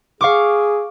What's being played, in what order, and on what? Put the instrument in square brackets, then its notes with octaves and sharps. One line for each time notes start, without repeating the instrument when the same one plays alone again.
[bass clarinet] G#4 [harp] F5 C#6 D6